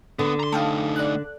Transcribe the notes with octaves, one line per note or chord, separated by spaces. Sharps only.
D3 B3
A#5 C6
A3 D#4 F5 G5 A5
D5 F#6